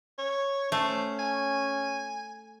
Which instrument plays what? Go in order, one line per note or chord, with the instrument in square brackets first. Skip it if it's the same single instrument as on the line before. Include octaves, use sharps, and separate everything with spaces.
[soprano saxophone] C#5
[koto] A3 [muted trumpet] C#4 [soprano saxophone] C5
[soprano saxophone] G#5